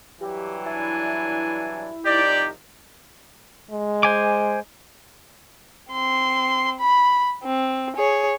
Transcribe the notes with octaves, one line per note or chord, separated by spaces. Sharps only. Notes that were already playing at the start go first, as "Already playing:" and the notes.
G2 E3 F#3 G4
D4 E4 G#5
C2 F3 D#4 G4 D5
G#3
C5 G#5 D6
C4 C6
B5
C4
G#4 C#5